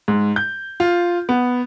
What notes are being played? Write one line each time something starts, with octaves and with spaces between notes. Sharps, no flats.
G#2
G6
F4
B3